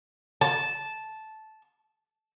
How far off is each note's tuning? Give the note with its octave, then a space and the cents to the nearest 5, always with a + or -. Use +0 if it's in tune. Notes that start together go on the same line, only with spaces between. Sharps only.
A5 -10